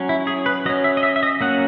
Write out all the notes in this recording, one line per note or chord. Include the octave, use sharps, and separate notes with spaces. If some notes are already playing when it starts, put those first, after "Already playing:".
Already playing: F#3 C#4
E4
G#4
B4
F#3 C#4 D#5
E5
D#5
E5
E5
D#5
F#3 A#3 C#4 F#5